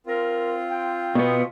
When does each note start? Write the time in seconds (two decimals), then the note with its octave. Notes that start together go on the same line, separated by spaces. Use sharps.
0.07 C4 F4 A#4
0.69 G5
1.15 B2 B3